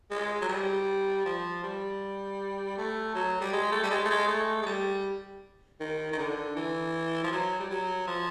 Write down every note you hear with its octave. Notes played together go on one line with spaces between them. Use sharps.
G#3
F#3
G3
F3
G3
A3
F#3
G3
G#3
A3
G3
G#3
A3
G#3
A3
G#3
G3
D#3
D#3
D3
E3
F3
F#3
G3
F#3
F3